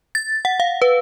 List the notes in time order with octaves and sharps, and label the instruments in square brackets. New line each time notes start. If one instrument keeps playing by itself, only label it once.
[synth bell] A6
F#5
F5
B4